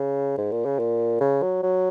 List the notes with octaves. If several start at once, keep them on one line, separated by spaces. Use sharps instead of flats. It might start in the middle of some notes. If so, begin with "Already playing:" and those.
Already playing: C#3
G#2
A#2
C#3
A#2
C#3
F#3
F#3